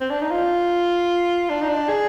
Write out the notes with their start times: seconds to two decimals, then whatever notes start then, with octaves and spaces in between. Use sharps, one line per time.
0.01 C4
0.11 D4
0.21 D#4
0.31 F4
1.50 D4
1.62 D#4
1.68 D4
1.89 G#4